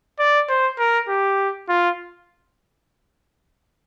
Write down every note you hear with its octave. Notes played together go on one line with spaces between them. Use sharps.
D5
C5
A#4
G4
F4